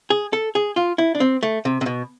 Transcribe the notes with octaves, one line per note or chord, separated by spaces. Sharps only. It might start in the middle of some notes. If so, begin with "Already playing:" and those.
G#4
A4
G#4
F4
E4
D4
C4
A3
C3
C3
B2